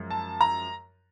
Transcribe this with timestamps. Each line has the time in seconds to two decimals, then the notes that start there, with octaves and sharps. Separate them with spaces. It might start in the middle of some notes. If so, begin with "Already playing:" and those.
Already playing: F#2 F3 G#3
0.11 A5
0.41 A#5